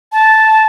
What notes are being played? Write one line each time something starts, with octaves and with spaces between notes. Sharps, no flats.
A5